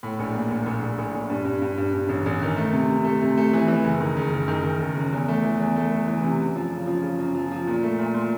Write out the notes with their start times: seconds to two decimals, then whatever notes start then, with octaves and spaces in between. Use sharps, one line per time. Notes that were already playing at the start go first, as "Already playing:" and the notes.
0.03 A2
0.19 A#1
0.35 A#3
0.51 A#1
0.66 A#1
0.82 A#1
0.98 A#1
1.14 A#1
1.30 G2
1.45 G2
1.62 G2
1.78 G2
1.93 G2
2.09 A1
2.26 A1
2.42 D#3
2.57 A3
2.72 C3
2.89 C3
3.05 A3
3.21 C3
3.37 A3
3.53 E3
3.68 E3
3.84 F#1
4.01 D#3
4.17 F#1
4.33 F#1
4.48 D#3
4.64 D#3
4.80 F#1
4.97 F#2
5.13 E2
5.28 A3
5.44 E3
5.60 E2
5.76 A3
5.91 A3
6.08 E3
6.23 C3
6.39 F#2
6.56 F3
6.71 C#3
6.87 F3
7.02 C#3
7.19 F#2
7.34 F3
7.51 F3
7.67 A#2
7.83 A3
7.98 A#2
8.14 A#2